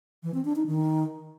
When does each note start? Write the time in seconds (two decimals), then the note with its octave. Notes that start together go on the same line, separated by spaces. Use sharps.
0.23 E3
0.34 C4
0.45 D4
0.56 D#4
0.66 D#3